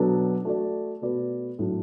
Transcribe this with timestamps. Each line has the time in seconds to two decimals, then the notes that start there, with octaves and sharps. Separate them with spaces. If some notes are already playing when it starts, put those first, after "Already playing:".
Already playing: B2 F#3 B3 D4 A4
0.45 A3 F#4 D5
1.02 B2 A3 F#4 B4 D5
1.59 A2 F#3 D4